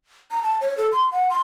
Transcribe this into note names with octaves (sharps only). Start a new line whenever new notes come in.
A#5
A5
C#5
A4
C6
F#5
C6